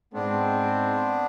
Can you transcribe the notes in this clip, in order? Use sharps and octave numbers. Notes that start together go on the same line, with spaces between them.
G#2 G#3 B3 C4 D4